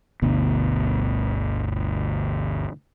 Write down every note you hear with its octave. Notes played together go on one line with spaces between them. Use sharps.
G1 D2 B2 B3